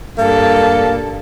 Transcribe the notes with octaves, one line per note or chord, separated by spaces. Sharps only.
G2 A#3 A4